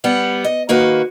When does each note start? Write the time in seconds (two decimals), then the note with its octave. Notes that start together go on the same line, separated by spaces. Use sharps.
0.04 G3 B3 F#5
0.44 D#5
0.69 D#3 A#3 F#4 B4